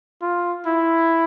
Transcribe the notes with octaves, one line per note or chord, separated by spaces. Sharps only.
F4
E4